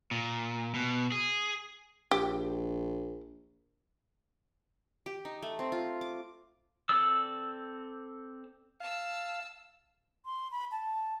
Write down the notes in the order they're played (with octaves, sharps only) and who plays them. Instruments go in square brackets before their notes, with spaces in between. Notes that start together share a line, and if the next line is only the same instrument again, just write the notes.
[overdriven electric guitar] A#2
B2
G#4
[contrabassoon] A#1 [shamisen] G4
[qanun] G4
D#4
A3
C4
F4
D6
[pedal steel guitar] C4 A4 D5 E6
[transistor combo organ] F5 [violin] A5 E6
[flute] C6
B5
A5